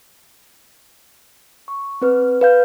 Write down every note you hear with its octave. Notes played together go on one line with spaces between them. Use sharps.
C#6
C4 B4 F6
B4 F5 G6